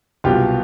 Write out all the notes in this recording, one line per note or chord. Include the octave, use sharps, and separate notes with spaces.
C2 B2 F#3 F4 G4